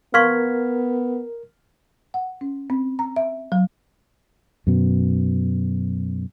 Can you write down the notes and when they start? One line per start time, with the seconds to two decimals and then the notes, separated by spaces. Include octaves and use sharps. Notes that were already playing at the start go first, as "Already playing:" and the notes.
0.14 B3 A#4 F5 C6 C#6 F6 G#6 B6
2.14 F#5
2.41 C#4
2.70 C4
2.99 A#5
3.16 E5
3.52 F#3
4.67 F#2 B2